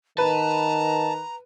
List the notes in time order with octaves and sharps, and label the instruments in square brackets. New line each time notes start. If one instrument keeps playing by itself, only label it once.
[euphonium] D#3 [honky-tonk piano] B4 [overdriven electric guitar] A5 [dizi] A#5